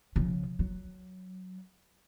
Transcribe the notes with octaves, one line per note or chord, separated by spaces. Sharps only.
C#3 F3
F#3